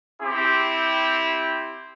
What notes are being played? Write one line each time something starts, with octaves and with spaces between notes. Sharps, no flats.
C4 E4 G4